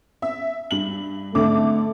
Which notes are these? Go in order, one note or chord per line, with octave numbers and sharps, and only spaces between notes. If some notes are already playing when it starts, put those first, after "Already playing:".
E5
G2 F#7
G#1 D3 A3 D6